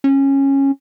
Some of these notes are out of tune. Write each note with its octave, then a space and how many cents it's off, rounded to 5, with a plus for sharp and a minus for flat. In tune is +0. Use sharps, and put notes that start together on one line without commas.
C#4 -15